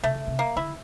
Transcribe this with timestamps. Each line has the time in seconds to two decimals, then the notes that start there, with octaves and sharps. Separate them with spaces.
0.03 C3 A3
0.15 C#3
0.27 C3
0.39 A#3
0.56 D3 E4